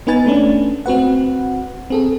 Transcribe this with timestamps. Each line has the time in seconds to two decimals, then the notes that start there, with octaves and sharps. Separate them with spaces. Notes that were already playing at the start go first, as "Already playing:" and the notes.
0.07 B3 D#4 B4 G#5 A6
0.26 A3 C#4 D4
0.86 C4 F#4 B4 F#5
1.90 C4 G#4 A4